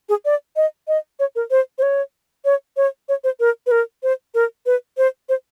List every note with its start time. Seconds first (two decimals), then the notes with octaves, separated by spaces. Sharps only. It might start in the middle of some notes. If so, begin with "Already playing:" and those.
0.09 G#4
0.25 D5
0.56 D#5
0.88 D#5
1.19 C#5
1.36 A#4
1.51 C5
1.78 C5
1.82 C#5
2.45 C#5
2.77 C#5
3.09 C#5
3.24 C5
3.40 A#4
3.67 B4
3.71 A#4
4.03 C5
4.35 A#4
4.66 B4
4.98 C5
5.29 C5